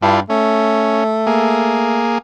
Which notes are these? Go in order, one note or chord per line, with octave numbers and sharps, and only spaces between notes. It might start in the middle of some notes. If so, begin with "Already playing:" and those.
G2 D4 E4 F4
A3 C#4
A#3 G#4